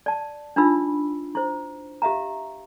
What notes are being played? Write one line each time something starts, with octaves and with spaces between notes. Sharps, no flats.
D5 A5
D4 D#4 F4 B5 E6
E4 C5
G4 E5 F5 A#5